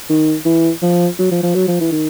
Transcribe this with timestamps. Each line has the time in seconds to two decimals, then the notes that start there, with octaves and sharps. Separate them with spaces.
0.09 D#3
0.45 E3
0.82 F3
1.19 F#3
1.32 F3
1.43 F3
1.55 F#3
1.68 F3
1.81 E3
1.92 D#3